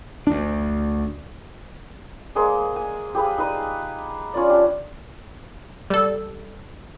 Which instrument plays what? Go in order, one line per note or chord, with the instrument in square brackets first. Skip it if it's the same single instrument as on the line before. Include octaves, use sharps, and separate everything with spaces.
[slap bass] D2 D4
[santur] G#3 A#3 G#4 C5
G#5
G4 G#4 B4 F5
D#4 B4
C#4 F4 D5
D4 G4
[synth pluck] G3 A4